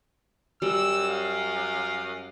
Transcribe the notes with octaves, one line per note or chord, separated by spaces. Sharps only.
F#2 G3 E6
F5